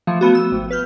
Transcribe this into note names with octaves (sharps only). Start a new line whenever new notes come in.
E3 F3 A3
A3 B3 F#4
E6
G#1
B4 F6 G6